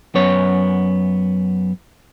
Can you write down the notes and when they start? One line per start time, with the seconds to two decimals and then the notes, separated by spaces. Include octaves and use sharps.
0.15 F#2 B3 C#5